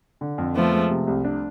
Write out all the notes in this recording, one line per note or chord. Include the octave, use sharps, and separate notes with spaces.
D3
F2
F3 A3 B3
G#3
C3
C2
D4